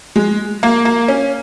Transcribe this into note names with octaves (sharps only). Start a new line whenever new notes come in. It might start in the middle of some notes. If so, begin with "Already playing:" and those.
G#3
A#3
A#3
C#4